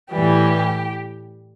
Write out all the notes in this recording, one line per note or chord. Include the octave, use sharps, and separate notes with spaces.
A2 E3 G3 G4